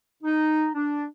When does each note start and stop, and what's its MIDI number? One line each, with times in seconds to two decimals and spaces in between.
0.23 0.68 63
0.74 1.05 62